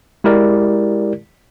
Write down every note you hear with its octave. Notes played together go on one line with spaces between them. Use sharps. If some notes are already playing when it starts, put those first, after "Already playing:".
G#3 E4 G4 A#4 D5